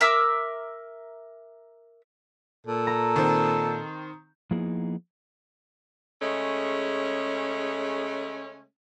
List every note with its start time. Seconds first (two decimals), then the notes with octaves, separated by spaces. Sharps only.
0.01 A#4 E5 D6 E6
2.66 A#2 A4
2.87 A#5
3.16 D#3 C4
4.51 F3 A#3 B3 D#4 E4 G#4
6.22 C#3 G#3 A3 C#4